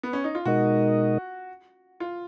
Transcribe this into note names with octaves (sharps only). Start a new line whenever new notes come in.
B3
C#4
D#4
F4
B2 G#3 D#4 F#4 A#4 D#5
F4